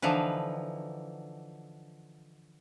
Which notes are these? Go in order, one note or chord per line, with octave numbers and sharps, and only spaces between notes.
D3 E3 F3 D#4 B4